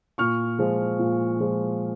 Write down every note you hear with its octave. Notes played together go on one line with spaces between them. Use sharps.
A#2 C#6 F6
F3 G#3
A#2
F3 G#3